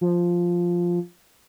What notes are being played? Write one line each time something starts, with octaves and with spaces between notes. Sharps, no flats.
F3